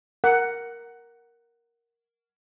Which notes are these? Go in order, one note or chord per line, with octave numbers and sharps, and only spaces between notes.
A#4 F#5